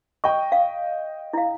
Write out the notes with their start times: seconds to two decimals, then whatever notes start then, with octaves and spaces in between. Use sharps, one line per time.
0.24 D#5 G5 C#6
0.52 F5
1.33 E4 F5